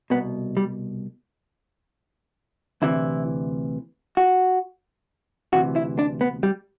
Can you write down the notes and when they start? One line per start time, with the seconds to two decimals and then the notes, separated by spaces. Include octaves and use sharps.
0.10 C2 B2 B3
0.57 G3
2.82 D2 C3 E3 E4
4.17 F#4
5.53 D2 C3 E3 F#4
5.76 E4
5.99 D4
6.21 B3
6.43 G3